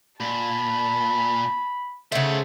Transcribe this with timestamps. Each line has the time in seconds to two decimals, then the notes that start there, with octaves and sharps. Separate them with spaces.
0.20 A#2 A5 B5
2.12 C#3 A3 C5 E5 F#5